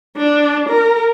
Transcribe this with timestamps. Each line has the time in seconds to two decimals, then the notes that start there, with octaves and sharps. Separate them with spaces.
0.17 D4
0.69 A#4